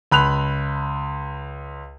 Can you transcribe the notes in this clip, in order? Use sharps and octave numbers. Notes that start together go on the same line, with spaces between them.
C#2 B5 F#6 F7